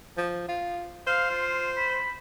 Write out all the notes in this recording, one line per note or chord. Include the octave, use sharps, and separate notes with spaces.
F3
F4
C5 F5
F4
B5